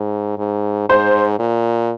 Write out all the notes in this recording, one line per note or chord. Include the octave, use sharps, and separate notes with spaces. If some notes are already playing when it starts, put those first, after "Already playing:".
Already playing: G#2
G#2
G#2 C5
A#2